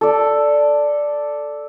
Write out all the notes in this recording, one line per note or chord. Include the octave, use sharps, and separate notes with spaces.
A4 D5